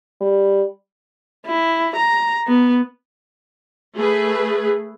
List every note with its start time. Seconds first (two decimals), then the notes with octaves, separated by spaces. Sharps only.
0.21 G3
1.47 E4
1.97 A#5
2.47 B3
3.96 A3 G#4 B4